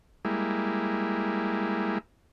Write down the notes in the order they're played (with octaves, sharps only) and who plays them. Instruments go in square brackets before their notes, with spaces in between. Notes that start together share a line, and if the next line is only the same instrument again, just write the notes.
[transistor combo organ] G3 G#3 A#3 E4